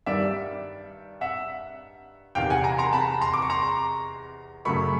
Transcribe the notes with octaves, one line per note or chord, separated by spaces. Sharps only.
G2 D#3 G3 D5 E5
E5 F#5
E2 C3 D#3 F5 G5
F#5 G#5
G#5 A#5
A#5 C6
A5 B5
A#5 C6
D6
C#6
A#5 C6
F#2 C#3 F#3 A3 B5 C#6